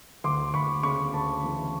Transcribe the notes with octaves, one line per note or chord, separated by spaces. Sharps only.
D2 C6 D6
D2 B5 C#6
C#3 B5 C#6
D2 A5 B5
E3